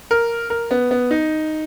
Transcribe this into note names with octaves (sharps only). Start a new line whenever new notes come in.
A#4
A#4
B3
B3
D#4